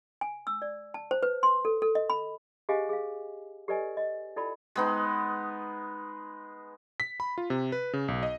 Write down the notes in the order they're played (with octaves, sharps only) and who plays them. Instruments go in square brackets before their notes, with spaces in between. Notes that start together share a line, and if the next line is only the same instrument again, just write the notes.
[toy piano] G#5
E6
D5
A5
C5
B4
C6
A4
A4
D#5
B5
G4 G#4 C5 D#5 F5 G#5
G#4 F5
G4 A4 B4 D5 D#5 G#5
D#5
E4 F4 A4 D5 G5 B5
[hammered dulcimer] G#3 B3 D#4
[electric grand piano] B6
B5
F4
C3
B4
C#3
B1
D#5